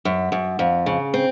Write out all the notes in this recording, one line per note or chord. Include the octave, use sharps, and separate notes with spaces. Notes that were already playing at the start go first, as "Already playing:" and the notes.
F#2
F#2
F2
C#3
C4